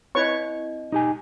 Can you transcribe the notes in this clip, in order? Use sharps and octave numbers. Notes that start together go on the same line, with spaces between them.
C4 E4 B4 C#5 D#5 C#6
D#4 G4 G#5